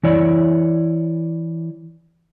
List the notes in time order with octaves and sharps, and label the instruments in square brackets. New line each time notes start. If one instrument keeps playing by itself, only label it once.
[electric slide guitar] E3 E4 C#5 D5